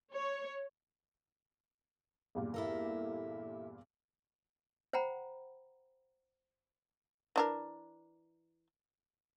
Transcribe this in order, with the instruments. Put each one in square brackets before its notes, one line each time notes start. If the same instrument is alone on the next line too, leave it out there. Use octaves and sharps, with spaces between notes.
[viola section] C#5
[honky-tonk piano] E2 G2 A#2
[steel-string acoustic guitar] E4 A4 A#4
[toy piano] C5 F#5 G5 A#5 B5
[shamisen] E3 D4 A#4